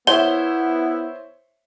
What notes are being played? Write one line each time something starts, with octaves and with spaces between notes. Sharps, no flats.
B3 E4 C5 C#5 E5 G7